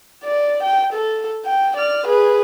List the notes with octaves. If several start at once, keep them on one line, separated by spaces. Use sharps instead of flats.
D5
G5
A4
G5
D5 F6
G#4 B4